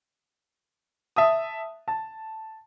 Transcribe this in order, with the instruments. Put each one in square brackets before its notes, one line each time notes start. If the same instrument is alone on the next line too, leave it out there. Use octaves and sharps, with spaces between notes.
[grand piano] E5 A5 D#6
A5